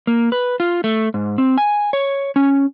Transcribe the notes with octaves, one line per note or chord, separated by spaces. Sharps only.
A#3
B4
F4
A3
G#2
C4
G#5
C#5
C#4